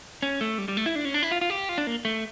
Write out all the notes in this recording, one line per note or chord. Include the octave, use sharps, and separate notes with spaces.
C#4
A3
G3
G3
A3
E4
D4
C#4
D4
E4
F4
F4
G4
F4
D4
A#3
A3